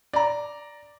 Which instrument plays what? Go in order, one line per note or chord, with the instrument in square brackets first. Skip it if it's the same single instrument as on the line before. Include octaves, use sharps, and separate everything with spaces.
[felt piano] D5 A#5